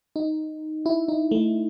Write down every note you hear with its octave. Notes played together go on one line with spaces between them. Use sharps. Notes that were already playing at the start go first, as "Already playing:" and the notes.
D#4
E4
D#4
A3